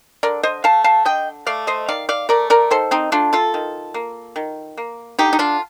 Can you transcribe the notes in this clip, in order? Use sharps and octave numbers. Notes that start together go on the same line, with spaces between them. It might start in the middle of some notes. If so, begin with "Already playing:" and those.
D3 A#4 D5
C5 D#5
A3 F5 A5
F5 A5
D3 D#5 G5
A3 D5 F5
C5 D#5
D#3 D5 F5
D5 F5
A3 A#4 D5
A#4 D5
D#3 A4 C5
C4 D#4
A3 D4 F4
F4 A4
D#3
A#3
D#3
A#3
D3 D#4 G4
D#4
D4 F4